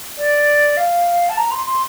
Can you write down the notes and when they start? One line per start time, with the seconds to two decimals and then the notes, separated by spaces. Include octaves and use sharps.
0.18 D5
0.77 F5
1.29 A5
1.37 A#5
1.51 C6
1.66 C6